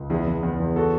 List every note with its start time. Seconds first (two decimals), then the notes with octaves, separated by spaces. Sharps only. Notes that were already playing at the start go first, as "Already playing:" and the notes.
Already playing: C#2
0.10 E2 E4 G#4
0.27 E2
0.43 E2
0.60 E2
0.76 F#4 A4